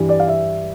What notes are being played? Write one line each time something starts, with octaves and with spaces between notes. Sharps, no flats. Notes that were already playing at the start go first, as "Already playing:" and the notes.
Already playing: G2 E3 G3
D5
F5
E5